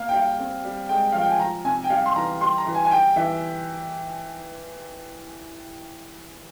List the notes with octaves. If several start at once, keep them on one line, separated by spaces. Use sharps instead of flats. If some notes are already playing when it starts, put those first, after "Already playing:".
Already playing: A#3 F5
G5
G3 F5
C4
G3
G#3 G5
F3 F5
G5
G#5
F3 A#5
C3 G#5
G5
G3 F5
C6
E3 A#5
G3 C6
A#5
E3
G#5
G#5
G3 G5
E3 E5